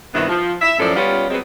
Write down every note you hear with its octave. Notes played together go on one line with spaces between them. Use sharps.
G2 C3 D#3 B3 E4
F3
E5
F#2 A2 F3 A4 D5
G3 B3 C#4 F4
F#3 G#3 B3 C4